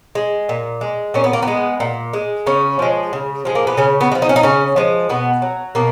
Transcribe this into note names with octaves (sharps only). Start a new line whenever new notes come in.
G#3
A#2
G#3
A#2 C#4
B3
A#3
B3
G#3
A#2
G#3
C#3 C#4
F3 G#3
C#3
F3 G#3
A#3
B3
C#3 C#4
B3
G#3
F3
D#4
C#4
D#4
C#3 C#4
F3 G#3
B2 B3
F#3
B2 A#3